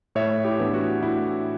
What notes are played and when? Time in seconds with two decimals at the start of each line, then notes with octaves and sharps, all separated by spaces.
0.15 A2 C#5 E5
0.45 E4 G4
0.59 E3 B3 D4
0.74 F#4
1.03 A2 E4